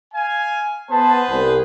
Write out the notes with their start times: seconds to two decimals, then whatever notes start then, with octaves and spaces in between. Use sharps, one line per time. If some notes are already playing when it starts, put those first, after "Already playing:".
0.13 F5 G#5
0.91 B3 G#4 B4 C5 A5
1.30 C2